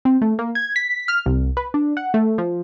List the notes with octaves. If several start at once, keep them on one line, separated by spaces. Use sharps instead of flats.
C4
A3
A#3
G#6
B6
F6
C2
B4
D4
F#5
A3
F3